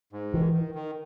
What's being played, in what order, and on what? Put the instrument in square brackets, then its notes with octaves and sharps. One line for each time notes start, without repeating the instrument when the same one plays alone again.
[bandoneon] G#2
[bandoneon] D#3 [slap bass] E3
[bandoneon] D#3
D#3